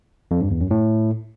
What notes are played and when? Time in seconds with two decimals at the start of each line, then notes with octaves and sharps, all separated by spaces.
0.31 F2
0.41 G2
0.51 E2
0.61 F#2
0.71 A2